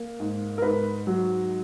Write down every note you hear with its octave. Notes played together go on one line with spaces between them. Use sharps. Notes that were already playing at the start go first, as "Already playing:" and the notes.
Already playing: A#3
G#2
A#4
G#2 B4
F#3